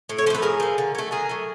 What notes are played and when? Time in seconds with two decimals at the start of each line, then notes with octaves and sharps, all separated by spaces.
0.09 A2
0.18 C#5
0.26 F3 C5
0.30 A3 B4
0.42 A2 G#4 A#4
0.60 F3 A3
0.78 D3
0.95 F#3 A3
1.11 D3 G#4 A#4
1.29 F#3 A3